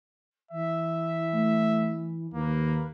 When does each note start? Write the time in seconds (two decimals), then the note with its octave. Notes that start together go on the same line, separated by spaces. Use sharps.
0.51 E3 E5
1.34 A3
2.34 D#2 A#3 B4